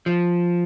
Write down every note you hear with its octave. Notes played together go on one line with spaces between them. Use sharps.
F3